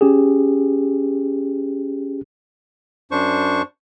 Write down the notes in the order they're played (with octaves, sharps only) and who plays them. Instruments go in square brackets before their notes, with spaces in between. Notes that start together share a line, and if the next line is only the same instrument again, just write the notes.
[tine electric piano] C#4 G4 G#4
[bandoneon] F#2 D4 C5 C#6